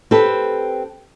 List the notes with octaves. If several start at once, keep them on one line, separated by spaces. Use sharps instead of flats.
C4 G4 A4 B4